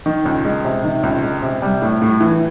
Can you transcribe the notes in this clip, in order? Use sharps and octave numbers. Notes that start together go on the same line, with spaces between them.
D#3
C#2
G#3
C3
D#3
C#2
G#3
C3
G3
A2
A2
E3